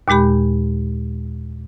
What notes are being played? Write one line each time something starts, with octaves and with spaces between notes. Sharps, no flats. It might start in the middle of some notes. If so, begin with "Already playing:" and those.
D#2 A#2 G#3 G4 B5